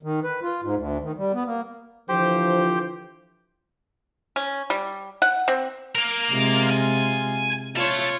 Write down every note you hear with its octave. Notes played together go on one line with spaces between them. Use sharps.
D#3
B4
F4
G#2
D2
D#3
G3
B3
A#3
D3 E3 F3 G4 C5 G5
C#4
G3
F#5
C4
A#3 A#4
C3 G#3 F4
G#5
A3 F4 C#5 A5